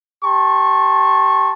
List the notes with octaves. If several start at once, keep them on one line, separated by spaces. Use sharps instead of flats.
G4 A5 C6 C#6